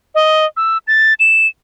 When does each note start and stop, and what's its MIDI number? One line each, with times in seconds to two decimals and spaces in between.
0.15 0.45 75
0.57 0.78 88
0.88 1.14 93
1.20 1.47 100